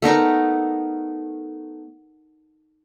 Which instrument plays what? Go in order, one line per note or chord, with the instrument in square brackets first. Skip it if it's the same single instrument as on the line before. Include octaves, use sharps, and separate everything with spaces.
[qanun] A3 B3 D#4 A#4